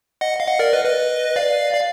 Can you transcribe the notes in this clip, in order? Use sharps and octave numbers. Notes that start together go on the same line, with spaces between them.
D#5 F#5
F5
D#5 F#5
A#4 D5
B4 D#5
B4 D#5
D5 F5
D5 F5